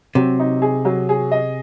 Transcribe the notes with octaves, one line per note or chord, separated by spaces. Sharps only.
C3 F#3
D#4
G#4
F#3
G#4
D#5